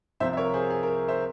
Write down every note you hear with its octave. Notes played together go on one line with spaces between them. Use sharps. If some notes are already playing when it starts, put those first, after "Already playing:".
C2 C3 F3 C5 E5
E5
A#4 C#5
G#4 C5
G#4
A#4
C5 E5